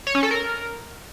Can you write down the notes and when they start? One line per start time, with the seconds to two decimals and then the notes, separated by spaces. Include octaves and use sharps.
0.07 C#5
0.15 C#4
0.23 A4
0.31 A#4